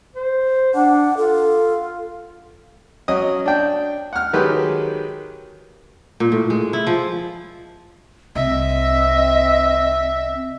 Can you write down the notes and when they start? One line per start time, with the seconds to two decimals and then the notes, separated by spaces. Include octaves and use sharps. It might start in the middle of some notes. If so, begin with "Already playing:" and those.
0.15 C5
0.75 D4 F#5
1.17 F4 A4
3.08 F#3 C#4 D#5 D#6
3.46 D4 G5
4.13 F#5 F6
4.33 D#3 F#3 G#3 G4 B4
6.20 A#2
6.32 A2
6.50 G#3
6.73 E4
6.87 F3
8.35 C2 C4 D#5 E5